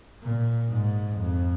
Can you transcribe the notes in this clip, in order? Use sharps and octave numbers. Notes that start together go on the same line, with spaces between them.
A#2
G#2
F2